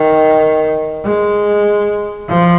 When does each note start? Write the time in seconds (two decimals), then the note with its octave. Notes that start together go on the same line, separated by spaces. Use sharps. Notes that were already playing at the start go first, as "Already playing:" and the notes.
Already playing: D#3
1.04 G#3
2.29 F3